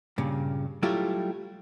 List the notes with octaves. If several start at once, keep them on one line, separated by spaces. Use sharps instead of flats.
G2 A#2 C#3
F#3 G3 A3 E4 F4 G4